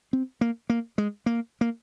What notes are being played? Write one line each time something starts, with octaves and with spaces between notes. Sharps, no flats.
C4
A#3
A#3
G#3
A#3
A#3